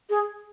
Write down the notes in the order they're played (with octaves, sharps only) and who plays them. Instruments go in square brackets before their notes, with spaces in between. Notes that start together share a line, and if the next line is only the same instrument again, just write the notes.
[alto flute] G#4